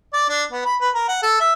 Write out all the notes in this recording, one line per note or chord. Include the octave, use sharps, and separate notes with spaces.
D5
D4
B3
B5
B4
A#4
F#5
A4
E5